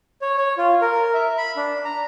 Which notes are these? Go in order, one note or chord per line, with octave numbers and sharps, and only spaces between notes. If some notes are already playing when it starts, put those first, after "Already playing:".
C#5
C#5
F4
A#4
E5
B5
D4
A#5